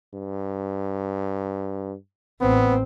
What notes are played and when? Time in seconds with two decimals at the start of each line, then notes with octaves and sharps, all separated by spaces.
0.14 G2
2.41 A1 B3 C4